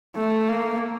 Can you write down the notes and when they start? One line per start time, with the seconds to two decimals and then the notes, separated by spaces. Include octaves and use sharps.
0.16 A3
0.49 A#3